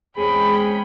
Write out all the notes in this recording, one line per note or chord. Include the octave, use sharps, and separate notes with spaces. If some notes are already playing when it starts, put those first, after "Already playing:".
E2 G#3 C4 C#4 G#4 G5 B5